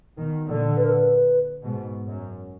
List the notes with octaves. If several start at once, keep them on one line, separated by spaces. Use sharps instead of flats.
B2 D#3
A#2 D3
B4
A#4
B4
G#2 B2
F#2